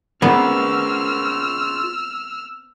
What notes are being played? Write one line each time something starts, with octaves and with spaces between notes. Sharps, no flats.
B3 C4 F4 G#4 A#4 D5 E6 F6